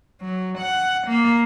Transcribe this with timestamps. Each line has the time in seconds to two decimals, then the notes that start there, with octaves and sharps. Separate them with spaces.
0.21 F#3
0.59 F#5
1.08 A#3